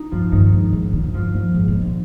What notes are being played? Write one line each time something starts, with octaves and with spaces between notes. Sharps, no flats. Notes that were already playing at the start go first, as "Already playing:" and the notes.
Already playing: D#4
G2 F3 F4
G2 D#3 D#4
G#2
G#2
D3
D3
C3
G2 F3 F4
F2
G#2
B2
D3